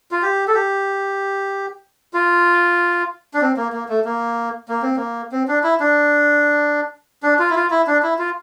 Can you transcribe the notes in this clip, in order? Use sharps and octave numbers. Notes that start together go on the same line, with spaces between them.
F4
G4
A4
G4
F4
D4
C4
A#3
A#3
A3
A#3
A#3
C4
A#3
C4
D4
E4
D4
D4
F4
E4
F4
E4
D4
E4
F4